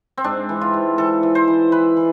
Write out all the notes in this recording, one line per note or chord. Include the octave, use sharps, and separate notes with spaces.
C4
G#2 D4
E3
F4
G#2
E3 A4
E3
C5
E3
E3 B4
E3